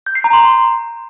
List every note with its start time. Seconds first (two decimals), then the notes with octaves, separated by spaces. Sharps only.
0.06 G6
0.15 C7
0.24 A#5
0.33 C6